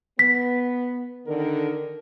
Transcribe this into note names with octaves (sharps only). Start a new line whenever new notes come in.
B3 B6
D3 D#3 A#4